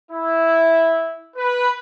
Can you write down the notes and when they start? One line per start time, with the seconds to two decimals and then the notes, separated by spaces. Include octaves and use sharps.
0.12 E4
1.36 B4